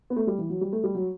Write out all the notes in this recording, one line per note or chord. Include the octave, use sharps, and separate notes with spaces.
B3
A3
G3
E3
F#3
G3
A3
G3
F#3